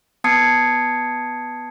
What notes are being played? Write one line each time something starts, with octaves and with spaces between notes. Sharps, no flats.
B3 A5 D#6 G#6 C7 C#7